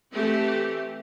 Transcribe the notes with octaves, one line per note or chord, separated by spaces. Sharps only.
E3 A3 C4 G4